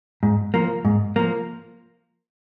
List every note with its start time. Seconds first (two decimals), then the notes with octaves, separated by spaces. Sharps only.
0.23 G#2
0.54 F3 A#3
0.85 G#2
1.16 F3 A#3